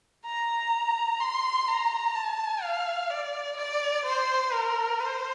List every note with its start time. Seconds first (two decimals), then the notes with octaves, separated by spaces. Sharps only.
0.26 A#5
1.20 C6
1.68 A#5
2.15 A5
2.62 F5
3.11 D5
3.58 D5
4.06 C5
4.53 A#4
5.00 C5